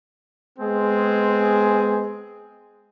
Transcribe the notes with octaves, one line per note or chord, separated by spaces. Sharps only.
G#3 B3 C4 G#4